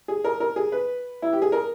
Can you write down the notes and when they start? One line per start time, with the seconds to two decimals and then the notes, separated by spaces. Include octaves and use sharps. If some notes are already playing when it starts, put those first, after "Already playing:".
0.08 G#4
0.24 A#4
0.40 A#4
0.56 G#4
0.72 B4
1.22 E4
1.33 G4
1.42 G#4
1.52 A#4